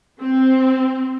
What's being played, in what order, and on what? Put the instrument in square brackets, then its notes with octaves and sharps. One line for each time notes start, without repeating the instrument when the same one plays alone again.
[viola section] C4